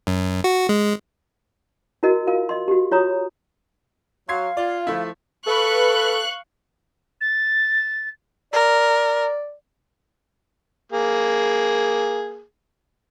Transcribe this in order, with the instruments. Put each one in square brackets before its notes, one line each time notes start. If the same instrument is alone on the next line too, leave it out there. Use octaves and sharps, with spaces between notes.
[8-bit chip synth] F#2
F#4
G#3
[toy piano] E4 F#4 A#4 D#5
F4 A#4 F5
D#5 C6
F#4 G4
F4 C#5 A#5 D#6
[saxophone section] F#3 [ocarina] F5 [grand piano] C6 G#6 C7
[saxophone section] F4 [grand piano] D5
[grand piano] F3 A3 E4
[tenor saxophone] A4 [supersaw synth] B4 [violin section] F5 C#6 F#6
[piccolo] A6
[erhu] A#4 [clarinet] D5
[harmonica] A#3 G#4